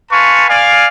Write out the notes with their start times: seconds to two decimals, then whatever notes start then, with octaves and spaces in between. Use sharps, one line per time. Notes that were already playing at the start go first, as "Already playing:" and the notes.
0.12 B4 F5 G#5 A5 C6 C#6
0.49 D5 F5 G#5